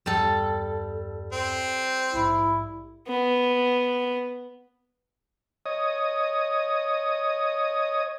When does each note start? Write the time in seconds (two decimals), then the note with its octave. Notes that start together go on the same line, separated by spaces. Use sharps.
0.06 E2 G2 G3 A4
1.33 C4
2.14 A#1 G#2 E4
3.08 B3
5.66 C#5 D#5 D#6